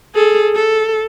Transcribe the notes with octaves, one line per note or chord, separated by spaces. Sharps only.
G#4 A4
A4